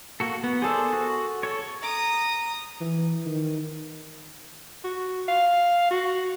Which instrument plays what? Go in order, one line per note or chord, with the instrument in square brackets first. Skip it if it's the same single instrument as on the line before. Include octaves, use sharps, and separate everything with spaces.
[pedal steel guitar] A#3 F#4 A4
B3
[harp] G#4 A4 [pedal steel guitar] C5 D5
[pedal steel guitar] F#4
A4 C#5
[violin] A#5 D#6
[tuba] E3
D#3
[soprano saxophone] F#4
F5
F#4